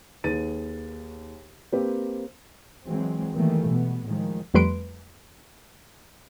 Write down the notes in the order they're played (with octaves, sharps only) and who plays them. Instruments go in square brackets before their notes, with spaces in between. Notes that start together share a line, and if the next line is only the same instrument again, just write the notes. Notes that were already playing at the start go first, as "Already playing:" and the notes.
[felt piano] D#2 G#4 B4 A6 D#7
A#3 C4 G4 B4
[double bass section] E3 F#3 G#3 C4
D#3 E3 G3 A3 A#3
B2 B3
A2 D#3 F3 G#3
[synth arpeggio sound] F2 G3 A3 B4 C6 D7